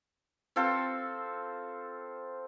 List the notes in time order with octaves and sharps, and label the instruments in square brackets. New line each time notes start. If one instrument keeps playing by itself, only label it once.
[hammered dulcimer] C4 F4 A4 C5